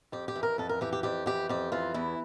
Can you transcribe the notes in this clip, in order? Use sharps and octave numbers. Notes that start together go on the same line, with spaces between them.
F2 G4
G4
E3
A#4
F2 A4
A#4
E3 G4
G4
F2 G4
E3 G4
F2 G4
E3 F4
E2 E4